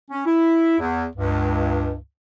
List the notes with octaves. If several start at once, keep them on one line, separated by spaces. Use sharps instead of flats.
C#4
E4
E2
C#2 G2